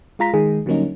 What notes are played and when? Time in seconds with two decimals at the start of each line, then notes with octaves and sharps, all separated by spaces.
0.19 G#3 F4 A#5 B6
0.34 D#3 G#3 G#4
0.66 D3 F#3 G3 A#3 C#4 D#4